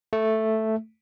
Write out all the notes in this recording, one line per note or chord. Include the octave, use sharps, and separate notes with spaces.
A3